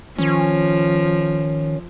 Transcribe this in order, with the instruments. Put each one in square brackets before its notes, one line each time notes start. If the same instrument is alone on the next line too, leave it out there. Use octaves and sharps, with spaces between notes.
[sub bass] D#3 [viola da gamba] F3 [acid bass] C#4